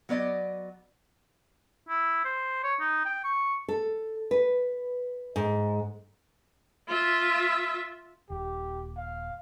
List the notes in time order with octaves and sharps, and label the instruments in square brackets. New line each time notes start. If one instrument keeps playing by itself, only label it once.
[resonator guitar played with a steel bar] F#3 B3 D5 D#5
[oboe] E4
C5
C#5
D#4
G5
C#6
[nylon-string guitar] A4
B4
G#2
[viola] F4 E5
[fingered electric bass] D#1 [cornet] G4
[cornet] F5